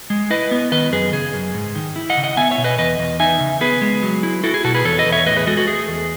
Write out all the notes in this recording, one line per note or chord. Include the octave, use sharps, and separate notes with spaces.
G#3
E4 B4 D#5
B3
D#3 B4 D#5
F#2 G#4 B4
C#3 G#4
F#2
G#2
D#3
E4
D#5 F#5
C#3
D#5 F#5
B3 E5 G#5
C#5 E5
B2
B4 D#5
E2 B4 D#5
E2
D#4 E5 G#5
C#3
B3 G#4 B4
G#3
F#3
E4
E4 F#4 A4
G#4
B2 F#4 A4
G#4 B4
E2 A4 C#5
B4 D#5
E2
C#5 E5
A2 B4 D#5
G#4 B4
G#3 F#4 A4
F#4 A4
A3 G#4
E2